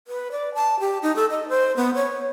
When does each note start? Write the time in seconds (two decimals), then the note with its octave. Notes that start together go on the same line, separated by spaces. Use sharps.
0.08 B4
0.32 D5
0.55 A5
0.80 G4
1.03 D#4
1.16 A4
1.31 D#5
1.49 C5
1.77 B3
1.95 C#5